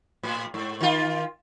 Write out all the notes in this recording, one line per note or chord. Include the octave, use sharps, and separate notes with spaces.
A2
G#2
D#3 F4